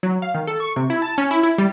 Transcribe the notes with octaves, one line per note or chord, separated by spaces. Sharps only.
F#3
F5
D#3
A4
C#6
C3
E4
A5
C#4
E4
E4
G3